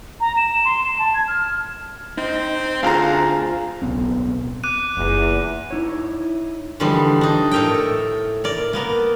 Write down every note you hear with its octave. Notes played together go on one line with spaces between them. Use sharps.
A#5
E7
C6
E7
A5
G#6
F6
C4 D#4
D2 F4 G#4 C5 F5 A#5
D1 B1 B3 C4
D6 F#6 D#7
F#1 E2 F4
D#4 E4 C#5
D3 E3 F3 G3 G#3 D#4
D4 D#4
A2 A3 A#4 D#5 G5
A4
A#4 D5
A#3 B3 A#4